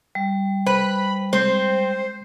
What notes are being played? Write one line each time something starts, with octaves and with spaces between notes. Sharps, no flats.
G3
B4 C5 B5
G#3 C4 C5